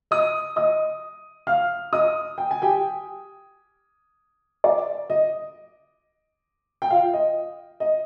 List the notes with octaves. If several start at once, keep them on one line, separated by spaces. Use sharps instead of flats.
D#5 D#6
D#5 D#6
F5 F6
D#5 D#6
G5
G#5
G4 G5
D5
D#5
G5
F4 F5
D#5
D#5